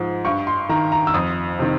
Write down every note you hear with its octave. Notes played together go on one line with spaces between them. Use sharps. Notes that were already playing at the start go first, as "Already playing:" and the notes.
Already playing: G#2 F3
G2 C#6
C6
D#3 A#5
A#5
E6
F2 D#6
C3 D#3